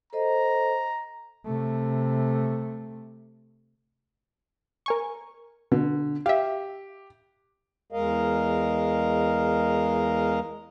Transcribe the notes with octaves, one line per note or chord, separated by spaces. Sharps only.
A4 C5 D#5 A#5
C3 A3
A#4 G#5 C#6
B2 D3
G4 E5 F5
E2 G#3 A#4 D#5 F5